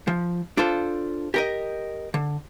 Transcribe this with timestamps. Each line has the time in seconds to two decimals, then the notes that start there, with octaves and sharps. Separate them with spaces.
0.07 F3
0.57 D4 F4 A4 C5
1.34 G4 A#4 D#5
2.14 D3